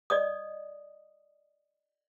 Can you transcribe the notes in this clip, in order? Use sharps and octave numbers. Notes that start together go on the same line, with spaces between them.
D5 D#5 D#6